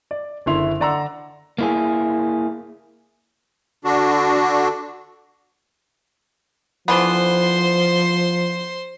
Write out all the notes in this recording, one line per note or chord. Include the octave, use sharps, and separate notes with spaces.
D5
F#1 D3 E4 C6 F7
D3 D5 F#5 A#5 C6 E6
A#3 E4 G#4
D3 D4 F#4
D3 E3 F3 B3 C5 C6